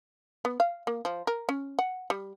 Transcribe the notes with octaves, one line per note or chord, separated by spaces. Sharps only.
B3
F5
A#3
F3
A#4
C#4
F#5
G3